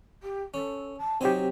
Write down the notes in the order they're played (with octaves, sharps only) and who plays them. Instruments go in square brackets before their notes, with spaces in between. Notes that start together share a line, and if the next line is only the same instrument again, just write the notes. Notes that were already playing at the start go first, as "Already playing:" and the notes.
[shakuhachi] G4
[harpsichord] C#4 [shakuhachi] A4
[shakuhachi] A5
[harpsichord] F#3 C5 G#5 [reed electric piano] C4 G4 [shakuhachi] D#4